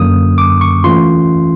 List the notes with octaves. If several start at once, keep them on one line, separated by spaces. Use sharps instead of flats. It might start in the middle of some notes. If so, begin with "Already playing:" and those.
Already playing: F#2 D3 F#3 A#3 C#4 D#6
D6
C#6
E3 A3 C#4 F4 C6